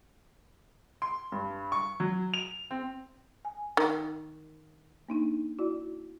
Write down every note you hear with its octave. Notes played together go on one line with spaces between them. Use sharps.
C6
G2
C#6
F#3
F7
C4
G#5
D#3
A#3 D4 D#4
E4 F#4 D5